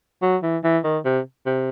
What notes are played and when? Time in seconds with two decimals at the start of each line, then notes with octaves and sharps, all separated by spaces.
0.22 F#3
0.43 E3
0.64 E3
0.84 D#3
1.05 C3
1.46 C3